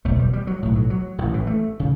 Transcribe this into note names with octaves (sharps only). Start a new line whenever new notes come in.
F#1 E2 B2 A3
G3
G3
F#3
B1 A2
F#3
F#3
A1 A2 D3
E3
A3
C#3